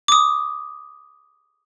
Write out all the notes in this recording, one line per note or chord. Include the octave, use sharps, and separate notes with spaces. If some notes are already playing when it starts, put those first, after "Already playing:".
D6 D#6